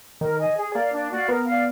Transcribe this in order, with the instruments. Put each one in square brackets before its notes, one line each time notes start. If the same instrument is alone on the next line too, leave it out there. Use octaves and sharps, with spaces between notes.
[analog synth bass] D#3 [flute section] A#4
[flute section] D#5 G#5
G#4
[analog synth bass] A#3 [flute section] D5 F5
[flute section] D4
F#4 D5 F5
[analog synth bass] B3 [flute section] A#4
[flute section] D5 F5